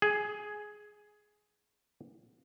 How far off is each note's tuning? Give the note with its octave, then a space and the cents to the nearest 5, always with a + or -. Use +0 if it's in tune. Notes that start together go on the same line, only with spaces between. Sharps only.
G#4 +10